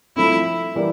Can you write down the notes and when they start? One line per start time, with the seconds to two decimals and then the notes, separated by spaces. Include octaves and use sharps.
0.16 F3 A3 C4 E4
0.75 E3 G3 A#3